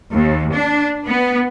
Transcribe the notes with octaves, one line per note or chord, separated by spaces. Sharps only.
D#2
D4
B3